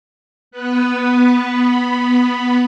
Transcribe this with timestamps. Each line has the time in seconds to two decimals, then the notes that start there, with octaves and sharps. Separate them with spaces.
0.51 B3 B4